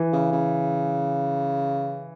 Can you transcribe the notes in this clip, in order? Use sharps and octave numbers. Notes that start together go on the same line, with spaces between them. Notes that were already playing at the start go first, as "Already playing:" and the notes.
Already playing: E3
C#3
C#3